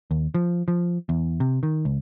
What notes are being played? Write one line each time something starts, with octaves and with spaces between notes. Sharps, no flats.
D#2
F3
F3
E2
C3
D#3
C#2